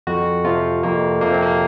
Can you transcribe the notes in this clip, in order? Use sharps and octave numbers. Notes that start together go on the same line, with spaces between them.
F2 F#4
C3 F3 F4
F2 A#3
C3 F3 A#3
C4
A#3